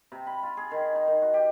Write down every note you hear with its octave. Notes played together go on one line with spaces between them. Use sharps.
C3
B5
F4
G#4
D#3
D#4
D#3
F#4
G4